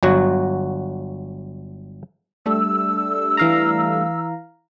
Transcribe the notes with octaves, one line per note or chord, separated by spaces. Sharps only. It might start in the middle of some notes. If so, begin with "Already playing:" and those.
G1 F#3 F#4
G3 A3 D4 E6
E3 F5 A#5